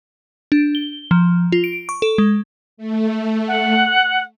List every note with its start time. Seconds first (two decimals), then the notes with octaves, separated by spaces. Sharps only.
0.52 D4
0.75 G7
1.11 F3
1.52 F4
1.64 D7
1.89 C#6
2.02 A4
2.18 G#3
2.77 A3
3.48 F#5